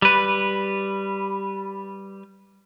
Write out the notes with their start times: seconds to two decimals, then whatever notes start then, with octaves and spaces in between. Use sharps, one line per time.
0.02 G3 B4